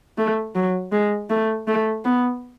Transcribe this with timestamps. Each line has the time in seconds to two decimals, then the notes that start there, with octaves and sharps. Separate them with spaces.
0.18 A3
0.55 F#3
0.92 G#3
1.30 A3
1.67 A3
2.04 B3